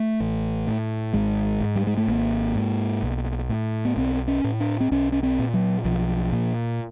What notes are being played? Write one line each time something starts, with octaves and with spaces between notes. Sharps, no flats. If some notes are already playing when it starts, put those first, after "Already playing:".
Already playing: A3
A1
A2
G#1 G#3
G#2
G3
G#3
A3
G#1 A#3
G#2
B1
A2
B3
B1 C4
C#4
A2
D4
C4
B1 C#4
C#4
C4
A#2
F#3
B1 F3
A#2